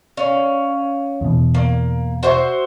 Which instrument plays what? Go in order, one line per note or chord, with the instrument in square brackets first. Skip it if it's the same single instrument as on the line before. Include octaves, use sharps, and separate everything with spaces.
[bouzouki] C#4 F5
[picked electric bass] E2 B2
[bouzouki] A#3
F#4 C5 E5